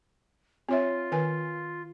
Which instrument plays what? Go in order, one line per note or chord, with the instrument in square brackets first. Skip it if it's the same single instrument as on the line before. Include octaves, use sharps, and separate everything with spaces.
[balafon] C4 C#5 E5 [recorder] F4
[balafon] D#3 B4 G#5